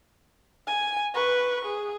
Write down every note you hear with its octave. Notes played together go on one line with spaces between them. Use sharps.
G#5
B4 C#6
G#4